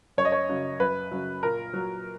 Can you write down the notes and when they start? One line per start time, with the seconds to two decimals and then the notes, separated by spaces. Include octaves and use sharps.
0.18 F#2 C#5
0.25 D#5
0.32 C#5
0.49 C#3 F#3
0.80 F#2 B4
1.11 C#3 F#3
1.43 A#2 A#4
1.73 F#3